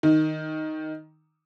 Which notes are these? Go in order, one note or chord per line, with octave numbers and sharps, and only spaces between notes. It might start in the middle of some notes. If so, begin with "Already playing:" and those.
D#3